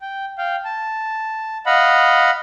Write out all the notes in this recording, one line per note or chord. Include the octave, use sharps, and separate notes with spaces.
G5
F5 G5
A5
D#5 F5 F#5 B5